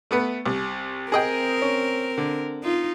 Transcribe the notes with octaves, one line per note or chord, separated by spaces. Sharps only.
A3 B3 B4
C2
C4 G#4 A#4 D#5 G5
C#4
D3
D#4 F4